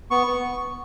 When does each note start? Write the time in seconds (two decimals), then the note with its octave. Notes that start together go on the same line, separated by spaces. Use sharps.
0.11 B3 C#6
0.27 B3